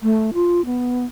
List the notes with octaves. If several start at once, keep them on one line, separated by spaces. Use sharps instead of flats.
A3
F4
B3